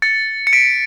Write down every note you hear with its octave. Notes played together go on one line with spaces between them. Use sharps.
A6 C#7
C#7
B6 D7